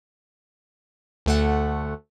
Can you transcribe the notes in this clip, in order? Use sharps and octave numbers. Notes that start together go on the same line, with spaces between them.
D2 A3 F#5